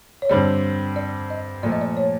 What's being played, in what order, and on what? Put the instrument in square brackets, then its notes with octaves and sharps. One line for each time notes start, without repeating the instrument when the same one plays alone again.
[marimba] C#5
[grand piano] G2 D3 G3 C4 [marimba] D5
[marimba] D5
D#5
[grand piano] A#2 F3 A3 [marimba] D5
[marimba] D#5
D5
C#5